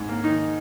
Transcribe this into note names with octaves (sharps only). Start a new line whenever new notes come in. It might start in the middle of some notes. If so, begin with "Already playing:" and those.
Already playing: G#2
A#3
D#3 D#4